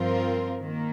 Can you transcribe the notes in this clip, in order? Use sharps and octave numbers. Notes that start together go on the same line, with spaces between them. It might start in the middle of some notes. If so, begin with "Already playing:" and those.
Already playing: G2 F3 C4 F4 A#4
D#3 A#3